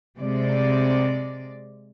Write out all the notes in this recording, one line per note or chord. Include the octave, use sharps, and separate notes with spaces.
C3 G#3 D5